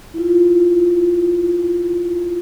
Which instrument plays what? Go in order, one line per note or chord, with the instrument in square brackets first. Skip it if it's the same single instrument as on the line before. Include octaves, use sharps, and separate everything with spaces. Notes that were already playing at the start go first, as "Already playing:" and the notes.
[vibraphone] E4 F4